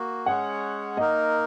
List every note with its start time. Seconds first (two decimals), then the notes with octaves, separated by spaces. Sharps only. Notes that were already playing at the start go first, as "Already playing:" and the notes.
Already playing: A#3 F#4
0.26 G#3 C#4 G#4 C#5 F#5
0.97 A#3 D#4 A#4 D#5